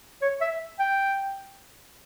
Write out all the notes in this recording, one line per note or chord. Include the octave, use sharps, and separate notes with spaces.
C#5
E5
G5